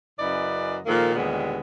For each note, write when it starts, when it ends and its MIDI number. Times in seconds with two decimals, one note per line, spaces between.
0.19 0.78 42
0.19 0.78 49
0.19 0.78 64
0.19 0.78 71
0.19 0.78 74
0.19 0.78 75
0.86 1.11 46
0.86 1.11 51
0.86 1.11 53
0.86 1.11 56
0.86 1.11 58
0.86 1.11 69
1.15 1.59 39
1.15 1.59 46
1.15 1.59 50
1.15 1.59 55
1.15 1.59 56
1.15 1.59 59